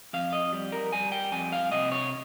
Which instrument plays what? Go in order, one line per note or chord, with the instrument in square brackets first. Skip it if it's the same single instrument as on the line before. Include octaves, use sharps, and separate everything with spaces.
[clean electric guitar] F2 F5
D#5
G3
A#4
G3 G#5
G5
F2 G#5
F5
C3 D#5
C#5